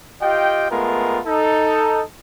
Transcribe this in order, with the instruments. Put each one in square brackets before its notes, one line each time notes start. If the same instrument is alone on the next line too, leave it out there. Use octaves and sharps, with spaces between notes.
[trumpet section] F4 G4 D#5 G5
G#3 A3 B3 F4 A#4
D#4 A4